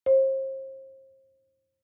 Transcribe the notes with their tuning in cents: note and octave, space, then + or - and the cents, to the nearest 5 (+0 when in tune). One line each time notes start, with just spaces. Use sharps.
C5 +40